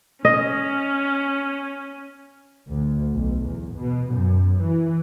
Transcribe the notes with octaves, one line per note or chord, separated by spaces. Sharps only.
C#4 D#5
D2
B1
E2
B2
F#2
E3